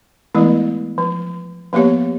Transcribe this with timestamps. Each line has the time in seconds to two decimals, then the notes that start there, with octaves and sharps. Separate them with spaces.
0.35 E3 G#3 A3 B3 E4
0.98 F3
1.73 F3 A#3 B3 G4 C#5